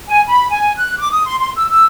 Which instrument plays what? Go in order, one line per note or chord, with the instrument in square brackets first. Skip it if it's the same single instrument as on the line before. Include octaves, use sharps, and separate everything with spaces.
[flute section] G#5
B5
G#5
F#6
D6
D#6
C6
C6
E6
E6